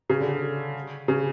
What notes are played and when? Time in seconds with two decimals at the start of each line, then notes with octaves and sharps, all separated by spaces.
0.10 C#3
0.20 D3
1.08 C#3